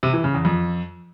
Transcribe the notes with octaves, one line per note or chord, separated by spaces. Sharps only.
C3
E3
C#3
E2
F2